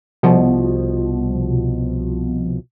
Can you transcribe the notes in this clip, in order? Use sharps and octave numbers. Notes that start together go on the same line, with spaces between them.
C2 B2 F3